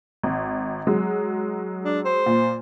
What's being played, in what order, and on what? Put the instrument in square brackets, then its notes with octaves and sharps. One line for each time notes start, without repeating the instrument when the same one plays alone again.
[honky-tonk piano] G#1
F#3 G#3
[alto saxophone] D4
C5
[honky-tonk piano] A#2